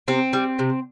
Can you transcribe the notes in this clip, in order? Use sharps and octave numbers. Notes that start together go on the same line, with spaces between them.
C3 C4
G3
C3